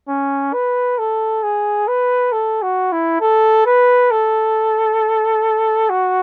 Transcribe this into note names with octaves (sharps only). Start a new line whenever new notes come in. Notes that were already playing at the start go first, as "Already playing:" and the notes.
C#4
B4
A4
G#4
B4
A4
F#4
E4
A4
B4
A4
F#4